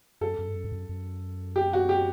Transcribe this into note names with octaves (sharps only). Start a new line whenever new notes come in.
F#2 A4
F#2
G2
F#2
G2
F#2
F#2
G4
F#4
G4